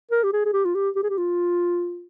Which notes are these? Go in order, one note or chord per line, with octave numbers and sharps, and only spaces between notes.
A#4
G4
G#4
G#4
G4
F4
G4
G4
G#4
G4
F4